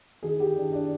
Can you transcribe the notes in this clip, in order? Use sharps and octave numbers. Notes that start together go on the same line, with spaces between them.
D#3 G#4
G4
D#3 D4
D4